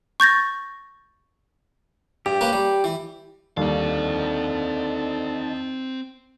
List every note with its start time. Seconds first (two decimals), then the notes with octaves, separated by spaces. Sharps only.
0.20 C#6 G6 A6 A#6
2.26 G2 G4
2.41 A#3 C#4 B4
2.53 G3
2.84 E3
3.57 D#2 D3 G3 C4 D#4 F5 A5